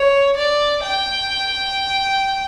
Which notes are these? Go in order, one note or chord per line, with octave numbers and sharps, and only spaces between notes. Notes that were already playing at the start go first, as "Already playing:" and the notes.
Already playing: C#5
D5
G5